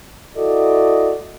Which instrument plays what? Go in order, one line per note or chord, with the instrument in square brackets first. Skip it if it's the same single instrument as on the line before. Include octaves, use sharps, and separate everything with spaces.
[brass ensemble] E4 F#4 A4 D5 D#5